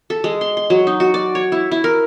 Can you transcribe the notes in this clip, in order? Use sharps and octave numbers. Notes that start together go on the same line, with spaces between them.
A4
G#3
C6
C6
F#3
D#4
F#4
D5
C#5
E4
E4
A#4